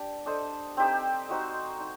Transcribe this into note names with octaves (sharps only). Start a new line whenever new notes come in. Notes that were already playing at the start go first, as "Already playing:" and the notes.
Already playing: D4 G4 D5
D4 A4 C5 D#5
C4 D#4 G4 C5
D#4 F#4 C5 D#5
D#4